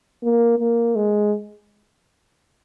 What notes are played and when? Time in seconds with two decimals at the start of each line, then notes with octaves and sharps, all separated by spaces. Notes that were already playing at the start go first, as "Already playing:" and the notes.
0.23 A#3
0.58 A#3
0.95 G#3